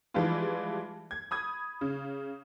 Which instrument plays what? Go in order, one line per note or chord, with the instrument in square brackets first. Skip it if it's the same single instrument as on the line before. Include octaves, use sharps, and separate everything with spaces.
[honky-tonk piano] E3 F3 G3 G#3 E4 F4
G#6
B5 D#6 G#6
C#3